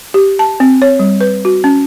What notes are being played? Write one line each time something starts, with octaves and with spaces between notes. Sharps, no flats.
G4
A5
C4
C#5
G3
B4
F#4
C#4